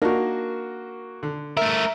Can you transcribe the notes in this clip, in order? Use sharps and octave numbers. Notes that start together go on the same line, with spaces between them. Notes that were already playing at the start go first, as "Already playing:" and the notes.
A#3 D4 D#4 F#4 A#4
D3
A3 A#4 E5